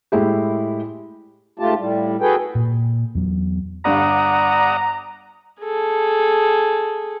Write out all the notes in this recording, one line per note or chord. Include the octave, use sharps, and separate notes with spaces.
A2 G#3 E4 G4
G#2 A3 F4 G4 A5
A2 G3
F#4 G#4 A4 B4 G5
A#2
E2 F#3 B3
G1 G2 D5 F5 F#5 A#5 D#6
G#4 A4